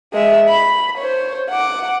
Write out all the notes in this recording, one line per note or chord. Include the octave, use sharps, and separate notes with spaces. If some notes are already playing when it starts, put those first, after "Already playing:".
G#3 E5
B5
C5 C#5
F#5 D6